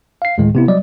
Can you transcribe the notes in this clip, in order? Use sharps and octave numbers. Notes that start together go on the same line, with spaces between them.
F5 C7
D2 A2 D#3 G#3
C3 B3 E4
F#3 G3 D5 D#5